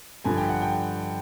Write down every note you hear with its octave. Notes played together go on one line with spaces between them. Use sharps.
G2 D3 F3 G#5
G5
F#5
G5